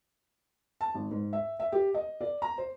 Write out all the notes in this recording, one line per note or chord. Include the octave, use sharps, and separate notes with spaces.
A5
G#1
G#2
E5
E5
G4
D#5
D5
A#5
C5